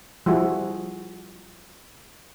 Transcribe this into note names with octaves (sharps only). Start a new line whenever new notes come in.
F3 G3 E4 F#4 G#4